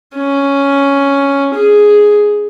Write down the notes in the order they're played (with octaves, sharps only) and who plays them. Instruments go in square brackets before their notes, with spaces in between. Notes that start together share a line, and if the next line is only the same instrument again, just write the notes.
[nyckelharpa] C#4
G#4